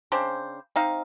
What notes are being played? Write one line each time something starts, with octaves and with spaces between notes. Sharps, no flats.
C#3 C4 D4 C5
C4 D#4 F5